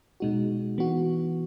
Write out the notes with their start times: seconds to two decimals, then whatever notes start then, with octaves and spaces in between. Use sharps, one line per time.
0.20 B2 G#3 D#4 F#4
0.78 E3 B3 F#4